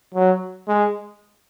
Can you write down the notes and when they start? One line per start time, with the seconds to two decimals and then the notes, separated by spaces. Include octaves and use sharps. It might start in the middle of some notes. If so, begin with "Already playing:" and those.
0.14 F#3
0.68 G#3